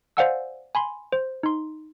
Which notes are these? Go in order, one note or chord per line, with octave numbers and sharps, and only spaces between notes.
C5 D5 F5 F#5 G#5 E6
G#5 B5 C6
C5
D#4 C6